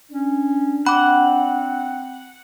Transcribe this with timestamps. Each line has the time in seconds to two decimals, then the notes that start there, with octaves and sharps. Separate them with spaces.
0.11 C#4 D4
0.86 C4 F#5 B5 D6